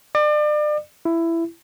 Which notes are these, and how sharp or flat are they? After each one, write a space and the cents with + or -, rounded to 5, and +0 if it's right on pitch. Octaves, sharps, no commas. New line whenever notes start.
D5 +35
E4 +15